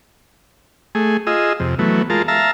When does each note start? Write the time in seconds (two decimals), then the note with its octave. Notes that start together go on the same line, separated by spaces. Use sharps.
0.95 A3 G#4
1.27 F4 G#4 D#5 E6
1.60 F2 C3
1.79 E3 F#3 A3 B3
2.10 G#3 F4 A#4 A5
2.28 E5 F5 A5 A#5